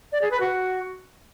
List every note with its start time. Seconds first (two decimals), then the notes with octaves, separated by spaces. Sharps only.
0.12 D5
0.22 G#4
0.31 B4
0.40 F#4